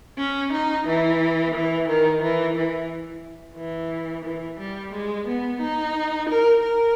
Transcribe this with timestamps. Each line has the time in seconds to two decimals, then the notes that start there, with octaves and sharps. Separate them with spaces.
0.18 C#4
0.52 D#4
0.87 E3
1.54 E3
1.88 D#3
2.22 E3
2.56 E3
3.57 E3
4.25 E3
4.59 G3
4.93 G#3
5.27 B3
5.61 D#4
6.29 A#4
6.62 A#4